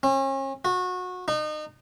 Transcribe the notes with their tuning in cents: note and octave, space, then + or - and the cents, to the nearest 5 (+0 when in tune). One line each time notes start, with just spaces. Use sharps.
C#4 -40
F#4 -25
D#4 -30